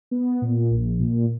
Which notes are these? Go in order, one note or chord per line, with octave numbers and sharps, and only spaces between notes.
B3
A#2
A#1
A#2